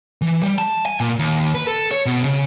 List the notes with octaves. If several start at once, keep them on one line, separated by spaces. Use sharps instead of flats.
E3
G3
A5
G#5
A#2
D#2
B4
A4
C#5
B2
C#3